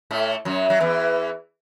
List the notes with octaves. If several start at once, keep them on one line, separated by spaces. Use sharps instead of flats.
A2 A3
F#2 F#3
F#3
E2 E3